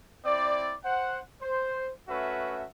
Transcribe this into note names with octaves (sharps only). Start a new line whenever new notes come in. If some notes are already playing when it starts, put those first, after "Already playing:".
C4 E4 D5
C5 F#5
C5
A3 C#4 F#4 B4 E5